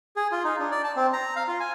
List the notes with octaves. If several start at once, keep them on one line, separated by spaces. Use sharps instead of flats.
G#4
F4
D#4
D4
D5
A5
C4
A#5
F5
F4
G#5